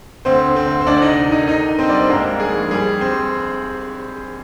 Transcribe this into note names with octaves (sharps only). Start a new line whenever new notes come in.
D2 C4 C5
D3
C4 C5
D2
C5
D2 D4 D5
D#4 D#5
C3
D#3 D#4 D#5
D3 D#4 D#5
D3
C4 C5
G3 D5
C5
G#2 A#3 A#4
G3
G#4
A#1
G3 G#4
G3
C4 C5
G3